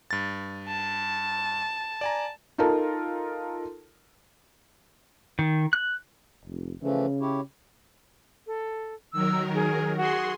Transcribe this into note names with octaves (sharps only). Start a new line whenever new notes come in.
G2 A6
A5
D5 G#5 A#5
D#4 F4 A4 A#4 A5
D#3
F#6
F1
C#3 E3 F3 A3
E4 G4 C#5
A4
D#3 F#3 A#4 E6
G#4
F#4 G#4 C6